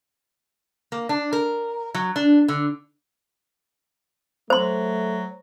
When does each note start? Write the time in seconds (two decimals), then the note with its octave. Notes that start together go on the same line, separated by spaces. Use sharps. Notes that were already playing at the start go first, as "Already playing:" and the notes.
0.92 A#3
1.09 D4
1.33 A#4
1.94 F#3
2.16 D4
2.48 D3
4.50 F#3 A3 C5 C6